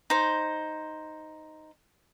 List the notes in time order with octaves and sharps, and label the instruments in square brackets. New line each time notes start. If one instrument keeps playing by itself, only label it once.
[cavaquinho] D#4 C5